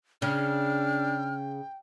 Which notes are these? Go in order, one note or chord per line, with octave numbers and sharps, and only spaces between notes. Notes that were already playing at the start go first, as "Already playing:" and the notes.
C#3 D4 G5 F6